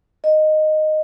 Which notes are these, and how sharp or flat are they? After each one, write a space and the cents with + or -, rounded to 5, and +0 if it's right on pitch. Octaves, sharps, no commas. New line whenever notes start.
D#5 -10